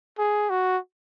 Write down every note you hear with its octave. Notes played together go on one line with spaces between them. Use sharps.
G#4
F#4